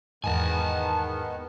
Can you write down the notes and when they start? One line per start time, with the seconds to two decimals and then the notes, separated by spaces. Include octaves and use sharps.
0.24 E2 G#2 D#3 B3 G#5 A5